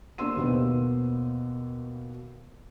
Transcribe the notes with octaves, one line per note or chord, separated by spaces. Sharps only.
A#3 D4 C5 C6 E6 D#7
D#2 B2 A#3 B3 B4 C5